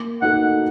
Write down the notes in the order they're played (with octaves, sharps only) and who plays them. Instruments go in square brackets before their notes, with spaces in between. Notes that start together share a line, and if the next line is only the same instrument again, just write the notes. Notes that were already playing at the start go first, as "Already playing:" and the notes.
Already playing: [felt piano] A#3
[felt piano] D#4 F#4 A4 [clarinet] F#5